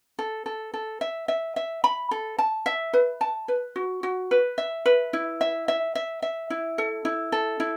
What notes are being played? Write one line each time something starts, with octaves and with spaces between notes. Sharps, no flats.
A4
A4
A4
E5
E5
E5
B5
A4
A5
E5
B4
A5
B4
F#4
F#4
B4
E5
B4
E4
E5
E5
E5
E5
E4
A4
E4
A4
E4